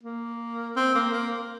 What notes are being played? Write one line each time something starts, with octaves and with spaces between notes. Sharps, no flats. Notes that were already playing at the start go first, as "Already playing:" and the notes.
A#3
C4
A#3
A#3